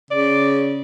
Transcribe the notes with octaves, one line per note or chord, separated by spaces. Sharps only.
C#3 D5